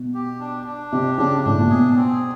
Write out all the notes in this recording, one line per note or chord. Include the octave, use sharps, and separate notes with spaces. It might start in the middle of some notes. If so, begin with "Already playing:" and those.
Already playing: B2
G4
D4
D4
C3 G4
C#3 D4
A2 D4
A#2
B2 G#4
C4